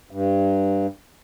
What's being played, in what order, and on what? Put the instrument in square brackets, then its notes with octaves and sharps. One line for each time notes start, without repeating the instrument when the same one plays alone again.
[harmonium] G2